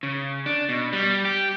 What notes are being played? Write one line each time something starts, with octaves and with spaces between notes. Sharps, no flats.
C#3
D4
B2
G3
G4